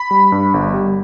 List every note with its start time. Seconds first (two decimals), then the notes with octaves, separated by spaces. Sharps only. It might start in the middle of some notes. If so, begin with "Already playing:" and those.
Already playing: B5
0.11 G3
0.32 G2
0.54 G1
0.74 G3